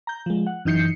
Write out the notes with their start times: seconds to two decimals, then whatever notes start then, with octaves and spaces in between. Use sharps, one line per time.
0.07 A#5 G6
0.26 F3 G#3
0.47 F#5
0.65 F#2 E3 D#4 G6 C7 C#7